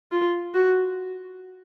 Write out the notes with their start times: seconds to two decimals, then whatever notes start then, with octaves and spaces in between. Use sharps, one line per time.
0.12 F4
0.54 F#4